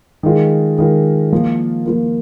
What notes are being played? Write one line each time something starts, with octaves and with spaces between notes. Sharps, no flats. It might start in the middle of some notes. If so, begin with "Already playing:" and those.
D#3 G#3 F4 A#4
D#3 G#3 F4 A#4
F3 A#3 F4 A#4
F3 A#3 F4 A#4